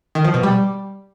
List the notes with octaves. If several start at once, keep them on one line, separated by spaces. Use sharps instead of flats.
D#3
F3
B2
G3